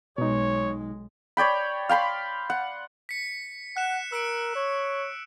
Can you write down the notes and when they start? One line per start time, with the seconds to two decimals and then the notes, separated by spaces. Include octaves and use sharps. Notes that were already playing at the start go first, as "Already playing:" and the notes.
0.18 B1 B2 G#3 D#4 C#5
1.37 C#5 D5 G5 B5
1.89 F5 G5 B5 C6
2.50 F#5
3.09 B6 C#7
3.77 F#5 F#6 E7
4.12 A#4 E6 C#7 D7
4.56 C#5